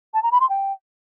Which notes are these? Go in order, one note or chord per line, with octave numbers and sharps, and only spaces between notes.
A5
A#5
B5
C6
G5